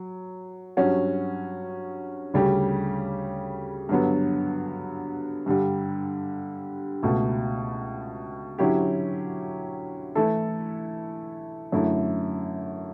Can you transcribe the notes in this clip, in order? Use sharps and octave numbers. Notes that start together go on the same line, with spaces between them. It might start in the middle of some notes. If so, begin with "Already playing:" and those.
Already playing: F#3
G2 F#3 C#4 F#4
D2 C#3 G3 C#4 G4
G2 D3 F#3 B3
G2 D3 G3
C#2 B2 A3
D3 F#3 C#4 E4 G4
E3 A3 E4 A4
F#2 D3 A3 E4